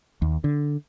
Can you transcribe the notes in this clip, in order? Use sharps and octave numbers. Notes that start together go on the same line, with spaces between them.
D#2
D3